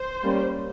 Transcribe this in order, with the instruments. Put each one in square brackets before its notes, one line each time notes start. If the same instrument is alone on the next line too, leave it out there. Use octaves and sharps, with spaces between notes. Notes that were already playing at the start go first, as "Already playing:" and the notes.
Already playing: [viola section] C5
G3 A#3 C#4